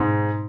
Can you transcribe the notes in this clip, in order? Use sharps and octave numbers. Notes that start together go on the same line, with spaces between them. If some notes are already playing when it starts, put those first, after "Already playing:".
Already playing: G#2 B2 G#3 C4 D#4